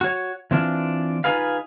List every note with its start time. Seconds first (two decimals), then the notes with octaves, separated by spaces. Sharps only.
0.01 F#4 C#5
0.51 E3 C4 D4 F4
1.24 D#4 F4 G#4 B4 F5